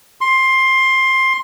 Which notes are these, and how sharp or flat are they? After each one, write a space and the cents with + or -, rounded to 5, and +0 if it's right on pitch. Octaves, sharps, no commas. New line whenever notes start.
C6 +15